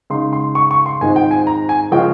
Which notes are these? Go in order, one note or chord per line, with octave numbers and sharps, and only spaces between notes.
C#3 G#3 D#4 C6
C6
C#6
C#6
C6
G#2 D#3 G#3 C4 F4 G#5
G5
G#5
A#5
G#5
C#3 F3 G#3 C#4 F4 G5